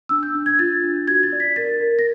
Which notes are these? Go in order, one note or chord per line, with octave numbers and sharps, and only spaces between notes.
D4 E6
G6
D4
G#6
F4 A6
D4
F#4 G#6
A6
D5
B6
A#4 A6
A#4
A#6